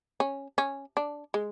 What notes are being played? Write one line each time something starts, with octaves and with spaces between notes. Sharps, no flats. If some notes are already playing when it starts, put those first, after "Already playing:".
C#4
C#4
D4
G#3